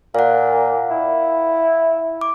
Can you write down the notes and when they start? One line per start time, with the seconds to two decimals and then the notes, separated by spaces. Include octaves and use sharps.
0.15 A#2 F5 F#5
0.90 E4
2.21 D6